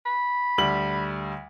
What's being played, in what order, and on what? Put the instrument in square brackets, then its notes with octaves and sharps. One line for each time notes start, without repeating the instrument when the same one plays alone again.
[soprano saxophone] B5
[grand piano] D2 G3 F#7